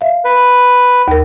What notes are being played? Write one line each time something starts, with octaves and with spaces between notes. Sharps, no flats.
E5 F5
B4
D#2 A#4